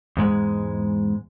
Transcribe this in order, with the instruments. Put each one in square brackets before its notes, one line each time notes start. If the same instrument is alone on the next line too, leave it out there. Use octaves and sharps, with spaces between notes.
[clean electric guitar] E2 G#2 G#3